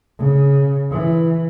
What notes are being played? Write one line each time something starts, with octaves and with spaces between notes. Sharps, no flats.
C#3
E3